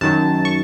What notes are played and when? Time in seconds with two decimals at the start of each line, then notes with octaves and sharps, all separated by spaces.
0.01 F#2 D#3 F#3 A5
0.45 C#6